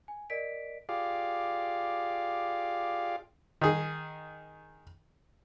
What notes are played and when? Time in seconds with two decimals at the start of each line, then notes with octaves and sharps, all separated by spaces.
0.08 G#5
0.30 A#4 D5 D#5 B6 D7
0.89 F4 G4 G#4 D5 F5
3.61 D#3 G#4